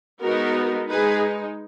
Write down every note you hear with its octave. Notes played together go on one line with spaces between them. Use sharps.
G#3 B3 D#4 F#4 A#4
G#3 D#4 G#4 B4